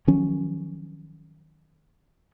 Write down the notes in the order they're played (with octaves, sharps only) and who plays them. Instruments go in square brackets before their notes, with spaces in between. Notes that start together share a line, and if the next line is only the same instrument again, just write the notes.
[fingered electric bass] D#3 F3 F#3 C#4